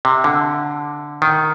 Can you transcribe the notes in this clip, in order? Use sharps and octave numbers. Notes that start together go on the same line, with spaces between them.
C3
D3
D#3